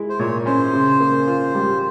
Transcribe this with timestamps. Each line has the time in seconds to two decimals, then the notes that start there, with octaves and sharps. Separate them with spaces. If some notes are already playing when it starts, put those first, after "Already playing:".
Already playing: G#3 E4
0.09 C5
0.19 A#2 C#5
0.46 C#4 C5
0.73 C#3
1.00 A#3
1.27 F4
1.55 G3